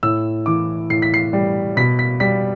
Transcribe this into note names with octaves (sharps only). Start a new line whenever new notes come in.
A2 E6
E3 D6
A2 C7
B6
C7
G3
B2 B6
B6
G3 B6